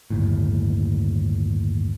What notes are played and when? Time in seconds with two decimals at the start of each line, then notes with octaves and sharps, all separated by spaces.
0.10 G1 D#2 A2